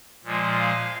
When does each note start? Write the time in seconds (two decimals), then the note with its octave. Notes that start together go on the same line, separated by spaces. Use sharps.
0.25 A#2 F3 G#3
0.59 F5